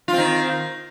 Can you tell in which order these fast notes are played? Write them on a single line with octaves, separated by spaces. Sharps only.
F4 C4 D#3